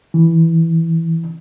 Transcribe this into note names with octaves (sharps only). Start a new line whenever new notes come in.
E3